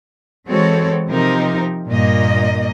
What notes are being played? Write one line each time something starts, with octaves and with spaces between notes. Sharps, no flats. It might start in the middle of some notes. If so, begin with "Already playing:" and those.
E3 G#3 C4 F#4 A4 C#5
C3 F3 C4 D#4 G4 A#4
G2 A#2 A#3 D#5